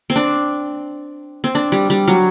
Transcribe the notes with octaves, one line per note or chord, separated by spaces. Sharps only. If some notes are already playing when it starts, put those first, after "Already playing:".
C4
D4
C4
D4
G3
G3
F#3